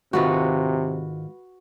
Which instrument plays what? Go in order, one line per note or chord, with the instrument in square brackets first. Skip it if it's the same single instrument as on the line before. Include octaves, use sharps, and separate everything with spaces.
[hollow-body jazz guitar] G#2 D#3 F4 [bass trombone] C3 [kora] F#4 B4